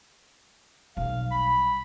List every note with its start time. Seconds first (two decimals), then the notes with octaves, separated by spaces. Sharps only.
0.97 B1 G3 F5
1.31 B5